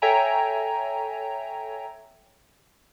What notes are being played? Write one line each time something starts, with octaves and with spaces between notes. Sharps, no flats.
A4 C#5 E5 G5 G#5 A#5